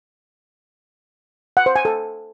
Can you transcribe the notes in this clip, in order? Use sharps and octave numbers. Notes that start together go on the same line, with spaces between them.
F#5
C5
G#5
A4